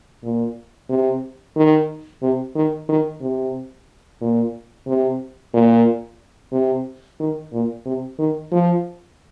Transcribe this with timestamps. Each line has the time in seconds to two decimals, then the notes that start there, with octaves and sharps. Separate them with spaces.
0.24 A#2
0.90 C3
1.56 D#3
2.22 C3
2.56 D#3
2.89 D#3
3.22 C3
4.21 A#2
4.87 C3
5.54 A#2
6.53 C3
7.20 D#3
7.53 A#2
7.86 C3
8.19 D#3
8.52 F3